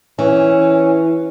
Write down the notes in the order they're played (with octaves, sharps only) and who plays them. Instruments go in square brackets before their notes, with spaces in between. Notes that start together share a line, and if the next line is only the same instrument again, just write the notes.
[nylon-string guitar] E3 [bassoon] C#4